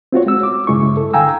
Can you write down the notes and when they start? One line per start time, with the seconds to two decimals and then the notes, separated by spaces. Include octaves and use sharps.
0.12 C4 F4 F#4 C#5
0.26 G#3 F#4 E6
0.43 D6
0.67 G2 C#3 G#3 E4 C#6
0.97 A4
1.13 D3 F5 G5 G#5 A#5 E6